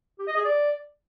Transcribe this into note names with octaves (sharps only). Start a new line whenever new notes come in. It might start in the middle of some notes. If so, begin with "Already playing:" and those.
G4
D#5
G#4
D5